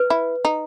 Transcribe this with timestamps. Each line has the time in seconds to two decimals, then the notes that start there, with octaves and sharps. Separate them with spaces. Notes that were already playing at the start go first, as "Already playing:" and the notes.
Already playing: B4
0.10 E4
0.45 D#4